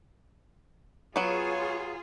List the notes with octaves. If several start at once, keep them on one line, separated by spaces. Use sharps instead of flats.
F#3 B3 F4 G#4 C#5